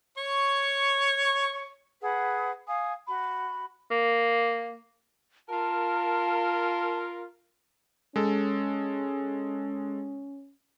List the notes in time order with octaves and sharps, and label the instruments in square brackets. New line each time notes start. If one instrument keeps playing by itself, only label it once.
[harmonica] C#5 C#6
[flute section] G#4 B4 F#5
F5 G#5 D#6
F#4 B5
[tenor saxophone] A#3
[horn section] F4 A#4 [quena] A5
[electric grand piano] G#3 A4 [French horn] C#4